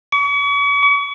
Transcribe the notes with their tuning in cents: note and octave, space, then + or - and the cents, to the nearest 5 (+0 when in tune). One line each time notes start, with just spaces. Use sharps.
C#6 +40